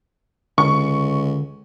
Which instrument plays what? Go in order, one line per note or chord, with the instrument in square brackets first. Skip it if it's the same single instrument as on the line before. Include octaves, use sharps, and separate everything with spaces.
[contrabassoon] C#2 [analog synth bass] D3 [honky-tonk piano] C#6